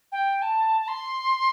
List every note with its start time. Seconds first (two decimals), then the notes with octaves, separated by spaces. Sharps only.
0.12 G5
0.42 A5
0.81 A5
0.88 C6